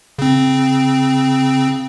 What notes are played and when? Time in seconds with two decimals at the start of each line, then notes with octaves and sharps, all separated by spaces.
0.19 C#3 C4